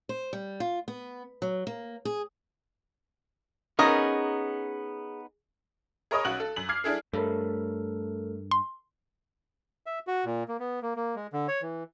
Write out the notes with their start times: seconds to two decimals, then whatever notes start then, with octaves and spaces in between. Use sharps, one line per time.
0.09 C5
0.33 G3
0.60 F4
0.88 B3
1.42 F#3
1.67 A#3
2.05 G#4
3.79 B3 C#4 D#4 G#4 A#4
6.11 G#4 A#4 C#5 D#5 B5 D#6
6.25 B1 C#4 F#4 F#6 F#7
6.40 A4
6.56 F#2 F#7
6.69 D6 F6 G#6 C7
6.84 D4 E4 G#4 A4
7.13 G2 A3 A4 A#4 C#5 B5
8.51 C6
9.86 E5
10.07 F#4
10.25 A#2
10.48 A#3
10.60 B3
10.82 A#3
10.96 A#3
11.16 G#3
11.33 D3
11.48 C#5
11.62 E3